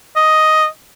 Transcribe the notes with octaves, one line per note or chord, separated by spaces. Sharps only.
D#5